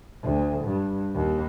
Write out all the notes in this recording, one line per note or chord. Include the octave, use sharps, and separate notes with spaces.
D2
G2
D#2